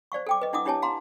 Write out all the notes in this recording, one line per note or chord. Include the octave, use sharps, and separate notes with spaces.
C5 D5 F5 C#6
A4 G5 D6
B4 D#5
D4 E4 F#5 D6 D#6
D4 E4 G4 C#5 G#5 A5
F5 A#5 C6